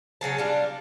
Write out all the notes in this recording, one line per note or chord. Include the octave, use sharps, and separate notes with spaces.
C#3 F#3 G#4 A5
G3 D4 F4